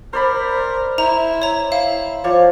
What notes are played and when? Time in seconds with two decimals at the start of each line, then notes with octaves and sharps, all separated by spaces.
0.13 A#4 C5 D5 B5
0.98 E4 A#5
1.42 C#5 A#5
1.72 E4 F5
2.24 F3 C#5 D5